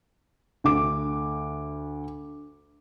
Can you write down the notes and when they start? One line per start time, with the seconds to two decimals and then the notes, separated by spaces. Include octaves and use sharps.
0.64 D2 D6